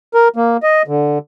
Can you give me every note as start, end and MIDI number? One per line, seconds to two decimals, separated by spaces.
0.14 0.28 70
0.36 0.57 58
0.63 0.82 75
0.88 1.18 50